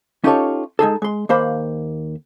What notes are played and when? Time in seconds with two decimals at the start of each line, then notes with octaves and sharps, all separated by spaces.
0.24 C#4 D#4 F4 G4 A4 C#5
0.79 G#3 D#4 G#4 A4
1.02 G#3 C6
1.29 D#2 A#3 C5 B5